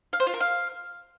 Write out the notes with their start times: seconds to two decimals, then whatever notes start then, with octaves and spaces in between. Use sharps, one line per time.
0.13 F5
0.20 C5
0.27 F4
0.34 A#4
0.40 F5